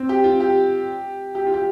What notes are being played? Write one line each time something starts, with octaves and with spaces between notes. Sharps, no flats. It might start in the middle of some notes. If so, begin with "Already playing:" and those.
Already playing: C4
G4
F4
G4
G4
F4
G4